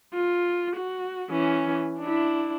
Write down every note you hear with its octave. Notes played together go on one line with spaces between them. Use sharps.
F4
F#4
E3 C#4
D4 E4